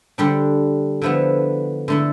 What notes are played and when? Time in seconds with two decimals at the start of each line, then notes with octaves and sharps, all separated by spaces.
0.18 D3 G3 D4
1.02 D3 F3 B3 E4
1.88 D3 A3 E4